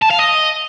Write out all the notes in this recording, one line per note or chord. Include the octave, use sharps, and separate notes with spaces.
A5
F5
D#5